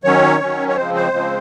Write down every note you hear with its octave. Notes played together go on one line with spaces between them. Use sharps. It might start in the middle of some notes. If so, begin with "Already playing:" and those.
D#3 F#3 C#4 C#5
D#3 F#3 C#4
C#5
C#3 F3 G#3 C4 C5
C5
C#3 F3 G#3 C4